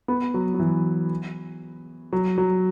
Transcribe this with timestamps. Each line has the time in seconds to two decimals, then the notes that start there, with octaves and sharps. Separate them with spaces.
0.08 B3
0.34 F#3
0.54 F#3
0.59 E3
2.13 F#3
2.38 F#3